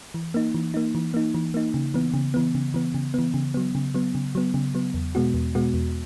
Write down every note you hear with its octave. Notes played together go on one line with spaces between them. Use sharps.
E3
A#3 D#4
E3
A#3 D#4
E3
A#3 D#4
E3
A#3 D#4
C#3
E3 B3
C#3
E3 B3
C#3
E3 B3
C#3
E3 B3
C#3
F#3 B3
C#3
F#3 B3
C#3
F#3 B3
C#3
F#3 B3
E2
B2 G#3 B3 F#4
E2
B2 G#3 B3 F#4
E2